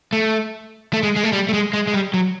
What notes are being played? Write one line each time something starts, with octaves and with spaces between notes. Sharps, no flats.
A3
A3
G#3
G#3
A3
G3
A3
G#3
G#3
G#3
G3
F#3